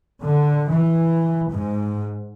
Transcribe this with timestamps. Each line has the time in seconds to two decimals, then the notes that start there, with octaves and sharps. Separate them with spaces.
0.22 D3
0.69 E3
1.51 G#2